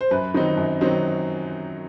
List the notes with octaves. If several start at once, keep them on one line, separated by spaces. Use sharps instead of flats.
C5
F#2 B4
D#3 F#3 C4 D#4
F#2
D#3 F#3 C4 D#4